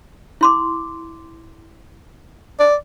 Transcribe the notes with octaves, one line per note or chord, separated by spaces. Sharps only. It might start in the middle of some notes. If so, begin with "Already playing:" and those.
E4 C6 D6
D5